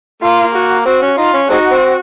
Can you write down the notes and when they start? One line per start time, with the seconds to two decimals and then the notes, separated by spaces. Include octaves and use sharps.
0.22 A#3 F4
0.54 F#4
0.86 C4 F#4
1.02 C#4
1.17 D#4 F4
1.34 C#4
1.49 G#3 C4 D#4 F#4
1.71 C4